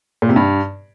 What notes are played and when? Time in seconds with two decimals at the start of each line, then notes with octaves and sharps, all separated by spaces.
0.22 A#2
0.29 C3
0.36 G2